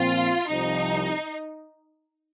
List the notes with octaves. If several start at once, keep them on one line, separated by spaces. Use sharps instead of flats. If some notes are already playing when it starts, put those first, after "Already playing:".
Already playing: A#2 F3 C4 F4
C2 C3 F3 D#4